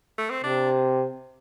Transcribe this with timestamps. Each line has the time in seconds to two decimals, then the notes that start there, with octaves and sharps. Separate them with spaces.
0.18 A3
0.31 C4
0.44 C3 D4